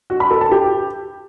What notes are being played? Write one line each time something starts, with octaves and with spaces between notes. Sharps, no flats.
F#4
B5
A4
A5
G4